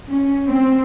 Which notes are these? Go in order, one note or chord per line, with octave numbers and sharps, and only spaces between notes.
C#4
C4